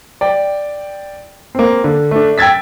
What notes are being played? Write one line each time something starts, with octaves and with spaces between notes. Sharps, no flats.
D5 G5
A#3 C4
D3
A3 D4
G5 E6 G#6 A6 B6